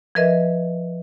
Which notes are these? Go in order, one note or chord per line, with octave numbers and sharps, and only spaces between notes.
F3 A#4 B4 D#5 E5